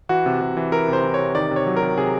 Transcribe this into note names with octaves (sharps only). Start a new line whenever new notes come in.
E3 F#4
C3
C3
E3
E3 A#4
C3 C5
E3
C3 C#5
D#3 D5
C3
C#5
F#3
A#4
C3
C3 G#4